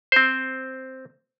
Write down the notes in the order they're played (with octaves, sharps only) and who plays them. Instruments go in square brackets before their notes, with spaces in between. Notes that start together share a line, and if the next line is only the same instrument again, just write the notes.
[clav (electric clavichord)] C4 C5